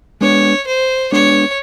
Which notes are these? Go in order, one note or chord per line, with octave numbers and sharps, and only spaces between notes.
G#3 B3 D4 C#5
C5
G#3 B3 D4 C#5